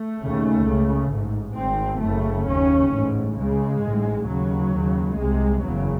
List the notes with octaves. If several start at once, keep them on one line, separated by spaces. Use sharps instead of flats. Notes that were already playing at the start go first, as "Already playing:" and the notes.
Already playing: A3
D#2 C#3
C#2 C#3
A1 G#2
G#1 G#2 C4
F#1 F#2 C#3 A3
D#2 C#3 C#4
A1 G#2
C#2 C#3 G#3
G#2
A1
D#2 C#3 F#3
D#2 C#3
C2 C3 G#3
F#1 E2 C#3 F#3